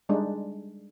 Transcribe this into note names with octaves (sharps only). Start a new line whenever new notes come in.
G3 G#3 D4 D#4